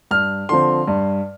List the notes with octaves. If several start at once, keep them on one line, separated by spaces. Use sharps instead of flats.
G2 F6
D3 F3 C4 C6
G2